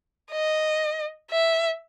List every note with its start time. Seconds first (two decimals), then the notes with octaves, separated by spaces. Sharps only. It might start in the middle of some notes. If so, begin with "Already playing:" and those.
0.32 D#5
1.31 E5